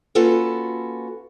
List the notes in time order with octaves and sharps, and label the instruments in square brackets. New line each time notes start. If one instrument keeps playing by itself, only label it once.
[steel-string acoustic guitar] A#3 C#4 F4 F#4 A4 B4